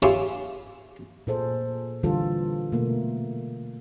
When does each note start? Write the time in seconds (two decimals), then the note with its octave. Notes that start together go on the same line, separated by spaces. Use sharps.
0.02 E4 F4 G4 G#4 C#5
1.27 A#2 G#4 A4 C5
2.03 D3 E3 G3 F4 A4
2.72 B2 A3 A#3